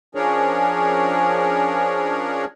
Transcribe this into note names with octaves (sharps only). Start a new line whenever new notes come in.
F3 C#4 D4 G#4 A#4 C#5